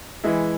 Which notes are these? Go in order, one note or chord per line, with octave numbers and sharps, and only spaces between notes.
E3 G#3 E4